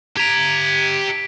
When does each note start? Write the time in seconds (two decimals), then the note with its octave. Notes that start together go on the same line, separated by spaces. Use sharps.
0.17 G4 A#5 G#6 B6 D7